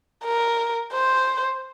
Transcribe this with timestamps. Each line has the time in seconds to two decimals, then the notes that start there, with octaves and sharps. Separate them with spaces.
0.24 A#4
0.93 C5